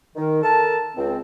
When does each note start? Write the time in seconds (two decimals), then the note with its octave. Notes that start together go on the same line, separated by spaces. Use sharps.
0.16 D#3
0.43 A4 A#4 A5
0.97 C#2 C4